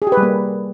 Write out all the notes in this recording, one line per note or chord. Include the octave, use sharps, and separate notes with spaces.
G#4
G4
B4
G3
A#3